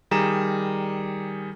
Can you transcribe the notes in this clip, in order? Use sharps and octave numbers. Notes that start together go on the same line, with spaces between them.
D#3 G3 G#4 A#5 E7